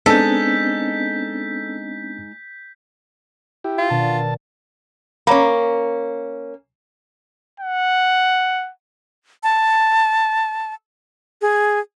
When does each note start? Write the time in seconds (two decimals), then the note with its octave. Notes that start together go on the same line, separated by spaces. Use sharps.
0.06 G#3 B3 C4 D4 D#4 A4 G6 B6
3.64 E4 G4
3.78 F4
3.90 B2 D#3 D4 A5
5.27 A#3 C#4 C#5 A#5 B5
7.60 F#5
9.43 A5
11.42 G#4